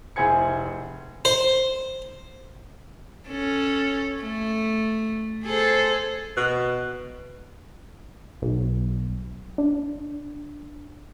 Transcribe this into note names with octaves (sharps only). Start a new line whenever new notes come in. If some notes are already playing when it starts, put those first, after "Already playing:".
F1 E4 G#4 C5 G#6 C#7
C5
C#4 A4
A3
G#4 A4 C5
B2
B1
D4